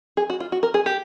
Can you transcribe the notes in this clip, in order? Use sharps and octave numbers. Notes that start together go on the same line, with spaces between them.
G#4
F#4
F4
F#4
A#4
G#4
G4